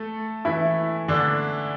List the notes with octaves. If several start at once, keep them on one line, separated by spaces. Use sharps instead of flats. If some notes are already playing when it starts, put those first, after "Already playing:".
Already playing: A3 A4
E3 E4
D3 D4